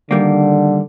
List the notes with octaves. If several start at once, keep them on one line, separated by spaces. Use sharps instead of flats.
D3 D#3 G3 A#3